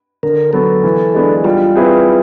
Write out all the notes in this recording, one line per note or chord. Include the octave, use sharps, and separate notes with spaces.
D3 A#4
F#3 B3 A4
E3
G#3 B3 D4
G3 F4
C4 E4 G#4 B4